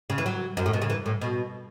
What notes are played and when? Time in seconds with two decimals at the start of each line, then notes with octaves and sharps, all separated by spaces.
0.10 C#3
0.18 E3
0.26 F#3
0.57 F#2
0.66 A2
0.73 B2
0.82 C#3
0.90 E3
1.06 A2
1.21 B2